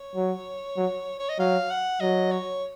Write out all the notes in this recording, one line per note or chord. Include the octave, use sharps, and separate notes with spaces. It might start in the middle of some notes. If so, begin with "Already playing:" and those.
Already playing: C#5
F#3
F#3
C#5
D#5
F#3 F5
F#5
F#3 D#5
C#5